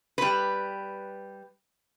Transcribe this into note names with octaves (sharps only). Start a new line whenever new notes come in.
G3 B4